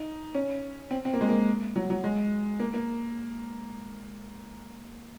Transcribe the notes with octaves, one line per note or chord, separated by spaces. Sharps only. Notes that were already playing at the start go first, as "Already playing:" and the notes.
Already playing: D#4
C#4
C4
C4
A#3
G#3
A#3
F#3
F#3
G#3
A#3
A#3